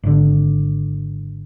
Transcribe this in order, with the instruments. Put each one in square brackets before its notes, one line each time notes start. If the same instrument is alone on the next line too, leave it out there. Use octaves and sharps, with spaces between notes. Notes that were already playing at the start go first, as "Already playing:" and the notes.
[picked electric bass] G#1 D3